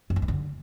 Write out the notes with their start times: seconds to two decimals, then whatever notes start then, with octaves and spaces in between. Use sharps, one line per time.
0.10 F#2
0.16 F3
0.22 G2
0.28 D3